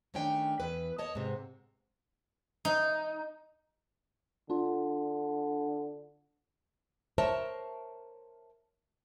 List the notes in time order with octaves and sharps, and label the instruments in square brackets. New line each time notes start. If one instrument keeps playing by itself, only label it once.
[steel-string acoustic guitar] D#3 A3 C#4 D4 G5
E2 B4
C#5 D#5 A5
G#2 C3
[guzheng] D#4
[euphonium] D3 [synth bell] D4 F4
[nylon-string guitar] A#4 C5 C#5 E5 A5